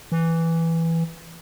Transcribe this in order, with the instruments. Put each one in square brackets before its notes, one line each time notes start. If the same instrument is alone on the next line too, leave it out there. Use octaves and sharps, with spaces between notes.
[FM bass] E3